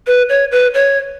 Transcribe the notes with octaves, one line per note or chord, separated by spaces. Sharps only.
B4
C#5
B4
C#5